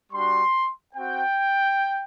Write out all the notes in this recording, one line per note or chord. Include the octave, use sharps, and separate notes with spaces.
G3 D4 F#4 C6
C4 F#4 G5